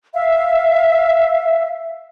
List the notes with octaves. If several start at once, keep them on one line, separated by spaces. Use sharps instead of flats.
E5 F5